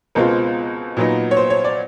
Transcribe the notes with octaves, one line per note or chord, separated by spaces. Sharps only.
C#2 B2 G#3 C4 F4 A#4
A#2 F#3 B3 D#4
C#5
C5
C#5
D5